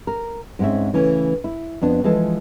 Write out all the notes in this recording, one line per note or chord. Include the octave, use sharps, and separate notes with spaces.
A#4
G#2 G#3 C4 C#4 E5
C#3 E3 A3 C#4
E4
F2 B3 D4
E3 F3 G#3 G#4 A4